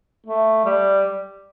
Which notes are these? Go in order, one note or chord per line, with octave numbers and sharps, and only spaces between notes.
A3
G3